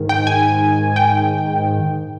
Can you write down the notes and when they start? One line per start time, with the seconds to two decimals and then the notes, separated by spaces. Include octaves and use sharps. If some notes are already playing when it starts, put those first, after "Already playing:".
Already playing: G#2 D#3
0.09 G5
0.27 G#5
0.96 G5